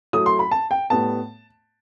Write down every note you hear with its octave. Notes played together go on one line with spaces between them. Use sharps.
F#3 A3 E4 D#6
C6
B5
A5
G5
A2 G3 B3 A5